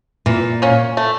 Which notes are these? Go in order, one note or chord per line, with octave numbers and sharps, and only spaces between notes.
A#2 E3
A#3 C#4
A3